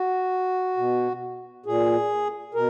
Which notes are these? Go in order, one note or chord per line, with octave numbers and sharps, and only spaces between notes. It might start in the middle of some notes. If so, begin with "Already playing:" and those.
Already playing: F#4
B2
A#2 G#4
B2 A#4